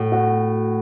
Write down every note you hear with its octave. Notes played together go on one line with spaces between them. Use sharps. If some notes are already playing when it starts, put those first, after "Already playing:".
Already playing: A2 F#4
F#4